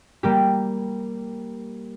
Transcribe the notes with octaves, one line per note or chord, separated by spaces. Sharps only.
G3 A#3 G4